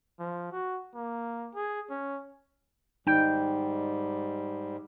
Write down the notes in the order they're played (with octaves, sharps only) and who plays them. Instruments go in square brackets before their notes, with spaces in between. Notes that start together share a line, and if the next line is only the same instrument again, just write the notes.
[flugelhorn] F3
F#4
A#3
G#4
C#4
[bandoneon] G#2 G3 [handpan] D#4 [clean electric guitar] G5